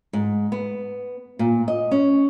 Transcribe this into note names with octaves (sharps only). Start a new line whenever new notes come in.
G#2
B3
A#2
D#5
C#4